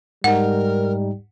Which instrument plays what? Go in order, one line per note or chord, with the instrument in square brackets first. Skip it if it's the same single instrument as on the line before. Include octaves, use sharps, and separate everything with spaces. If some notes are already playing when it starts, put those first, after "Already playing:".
[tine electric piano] G#2 D#4 [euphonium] G3 [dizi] A#4 [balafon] F#5